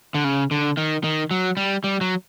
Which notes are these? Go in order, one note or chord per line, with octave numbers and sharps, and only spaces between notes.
D3
C#3
D3
D#3
D#3
F#3
G3
G3
F#3